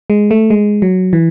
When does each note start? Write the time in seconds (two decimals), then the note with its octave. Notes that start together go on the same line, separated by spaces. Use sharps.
0.10 G#3
0.31 A3
0.50 G#3
0.82 F#3
1.13 E3